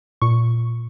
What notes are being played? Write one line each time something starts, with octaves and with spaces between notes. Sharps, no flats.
A#2 C#6